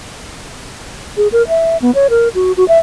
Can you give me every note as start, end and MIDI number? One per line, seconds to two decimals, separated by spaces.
1.17 1.28 68
1.32 1.47 70
1.48 1.77 76
1.82 1.94 59
1.95 2.08 73
2.10 2.29 70
2.35 2.52 66
2.57 2.67 66
2.68 2.78 76